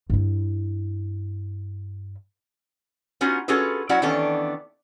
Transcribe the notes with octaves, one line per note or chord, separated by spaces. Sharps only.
G2 E4
B3 C#4 D#4 F4 F#4
C#4 F4 F#4 G#4 A4 B4
F#3 C#4 E4 F#4 D5 F#5
D#3 E3 B3 C#4 D4 A4